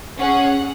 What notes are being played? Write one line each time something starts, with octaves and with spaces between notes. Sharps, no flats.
C#4 G#4 F#5